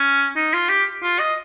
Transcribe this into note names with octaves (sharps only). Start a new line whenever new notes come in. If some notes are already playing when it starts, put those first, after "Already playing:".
Already playing: C#4
D#4
F4
G4
F4
D#5